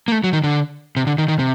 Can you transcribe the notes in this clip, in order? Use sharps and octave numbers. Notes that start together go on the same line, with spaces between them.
A#3
A3
F#3
D#3
D3
C3
D3
D#3
D#3
C3